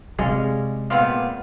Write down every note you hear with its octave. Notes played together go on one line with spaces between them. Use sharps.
C3 G#3 C#4 D5 F5
A#2 B3 C4 F5